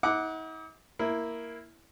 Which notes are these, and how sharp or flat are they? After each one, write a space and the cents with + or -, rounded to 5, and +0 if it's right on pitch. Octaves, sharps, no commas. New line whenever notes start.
D#4 +45 F#5 +0 D6 +0
A#3 +0 E4 +0